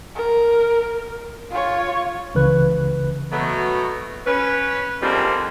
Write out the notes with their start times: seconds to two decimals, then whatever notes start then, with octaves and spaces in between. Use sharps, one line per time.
0.15 A#4
1.51 F4 C#5
2.35 C#2 C#3 E3 B4 F#6
3.31 B2 F#3 A3
4.26 C#4 B4
5.01 D3 F3 G3 G#3 A#3 C4